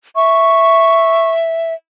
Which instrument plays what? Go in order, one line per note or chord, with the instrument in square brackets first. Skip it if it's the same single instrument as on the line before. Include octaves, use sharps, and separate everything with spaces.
[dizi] E5 [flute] C#6